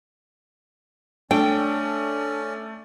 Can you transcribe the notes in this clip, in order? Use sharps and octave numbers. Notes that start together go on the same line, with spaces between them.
A3 C#4 D4 D5 G5